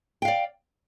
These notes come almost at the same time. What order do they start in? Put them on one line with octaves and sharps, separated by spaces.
G5 F5 D5